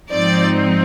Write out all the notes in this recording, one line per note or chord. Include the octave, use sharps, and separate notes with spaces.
G#2 F3 C4 D#4 D5